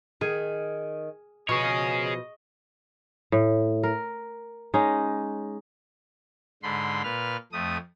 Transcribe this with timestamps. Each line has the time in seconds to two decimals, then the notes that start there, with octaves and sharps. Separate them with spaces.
0.21 D#3 G#4
1.49 B2 F3 G#4 C#5 D#5 C#6
3.32 A2
3.83 A#4
4.74 G#3 C#4 D#4
6.63 G#2 D3 B5 C6
7.03 A#2 B4 F6
7.52 F2 A3 D#6